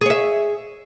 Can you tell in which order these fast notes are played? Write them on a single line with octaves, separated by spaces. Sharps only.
G#4 C#5 E5